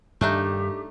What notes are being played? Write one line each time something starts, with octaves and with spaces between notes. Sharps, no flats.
G2 D#3 A3 D4 D#4 G4